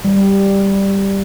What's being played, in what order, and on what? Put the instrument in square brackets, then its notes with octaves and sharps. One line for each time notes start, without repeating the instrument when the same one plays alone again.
[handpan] G3